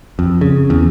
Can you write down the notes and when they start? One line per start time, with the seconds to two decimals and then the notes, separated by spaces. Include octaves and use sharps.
0.19 F2
0.41 C#3
0.70 E2